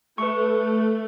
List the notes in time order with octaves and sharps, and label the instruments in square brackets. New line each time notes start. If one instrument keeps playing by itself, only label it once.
[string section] A3 [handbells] B4 C#6